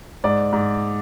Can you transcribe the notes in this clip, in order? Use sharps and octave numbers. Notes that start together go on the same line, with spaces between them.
G#2 D5
G#2